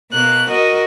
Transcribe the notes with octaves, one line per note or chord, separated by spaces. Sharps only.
B2 A#3 F#6
F#4 A#4 D#5